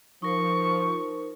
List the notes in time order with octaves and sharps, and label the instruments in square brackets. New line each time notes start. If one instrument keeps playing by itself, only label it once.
[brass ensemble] F3 [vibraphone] D#4 A#4 C5 [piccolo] C#6